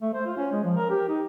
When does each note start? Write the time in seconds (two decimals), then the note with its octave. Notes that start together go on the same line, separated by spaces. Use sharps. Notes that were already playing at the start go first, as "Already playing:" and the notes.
0.02 A3
0.14 C5
0.26 F4
0.37 C#4
0.52 G#3
0.64 F3
0.77 A#4
0.90 G4
1.08 D#4